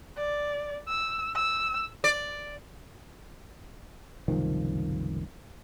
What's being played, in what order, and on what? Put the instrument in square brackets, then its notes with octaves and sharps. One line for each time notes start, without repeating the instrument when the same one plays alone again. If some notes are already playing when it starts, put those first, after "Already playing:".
[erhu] D5
E6
E6
[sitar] D5
[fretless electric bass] F#1 C2 D#3 F3